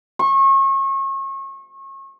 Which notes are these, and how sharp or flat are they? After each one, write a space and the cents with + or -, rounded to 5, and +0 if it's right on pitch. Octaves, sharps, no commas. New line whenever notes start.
C#6 -35